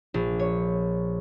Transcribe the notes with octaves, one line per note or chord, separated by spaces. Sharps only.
A#1
C#5